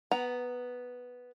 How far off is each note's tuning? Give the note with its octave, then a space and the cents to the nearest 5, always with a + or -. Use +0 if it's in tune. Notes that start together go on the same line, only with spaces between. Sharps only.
B3 +0 F#5 +25 A#5 +0